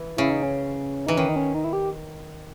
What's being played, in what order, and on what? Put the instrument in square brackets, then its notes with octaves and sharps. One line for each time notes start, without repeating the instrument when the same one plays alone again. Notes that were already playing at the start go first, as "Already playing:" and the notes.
Already playing: [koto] E3
[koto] C#3 [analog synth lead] E4
[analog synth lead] D#4
C#4
[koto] E3 [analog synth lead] D#4
[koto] D#3 [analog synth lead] C#4
[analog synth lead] D#4
C#4
D#4
E4
G4